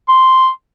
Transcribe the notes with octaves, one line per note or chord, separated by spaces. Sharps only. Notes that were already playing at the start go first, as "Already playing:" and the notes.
C6